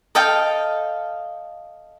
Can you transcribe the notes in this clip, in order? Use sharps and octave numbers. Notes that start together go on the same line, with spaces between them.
A4 D#5 F5 G5